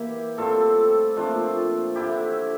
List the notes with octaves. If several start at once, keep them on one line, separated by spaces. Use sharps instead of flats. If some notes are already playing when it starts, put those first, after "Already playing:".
Already playing: E3 A#3 E4 G4
A2 G3 C4 F4 A4
A#2 F3 A3 C4 D4 F4
D3 F3 C4 E4 G4